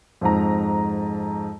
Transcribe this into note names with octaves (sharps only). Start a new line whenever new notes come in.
F2 G#2 A#5